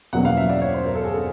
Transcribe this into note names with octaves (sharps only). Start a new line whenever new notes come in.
E2 B2 F#3 A#3 C#4 F#5
F5
E5
D5
C#5
C5
A#4
A4
G#4
A4